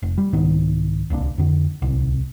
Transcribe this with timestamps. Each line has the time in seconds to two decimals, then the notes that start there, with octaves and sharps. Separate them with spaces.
0.02 F1
0.18 G3
0.33 C2 G#2 D#3 B3
1.10 D1 C2 A#3 D4
1.38 F2 D3
1.82 D1 C2